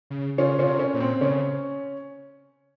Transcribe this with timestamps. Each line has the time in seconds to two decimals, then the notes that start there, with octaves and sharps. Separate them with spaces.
0.10 C#3
0.38 C#3 C#4 F4
0.58 C#3 C#4 F4
0.66 C3
0.79 C#4
0.94 A#2
1.00 C4
1.21 C#3 C#4